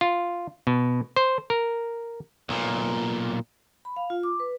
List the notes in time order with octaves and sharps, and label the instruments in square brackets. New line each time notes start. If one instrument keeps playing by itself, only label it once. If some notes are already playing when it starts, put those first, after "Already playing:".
[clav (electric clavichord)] F4
B2
C5
A#4
[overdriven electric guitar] B1 A#2
[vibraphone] B5
F5
F4
D6
B4